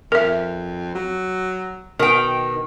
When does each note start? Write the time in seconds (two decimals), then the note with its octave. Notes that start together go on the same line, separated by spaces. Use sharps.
0.12 F2 A#4 E5
0.95 F#3
1.99 B2 D#3 A#4 G5